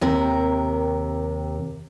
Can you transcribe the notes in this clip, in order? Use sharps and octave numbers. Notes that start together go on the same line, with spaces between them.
D#2 C3 A#4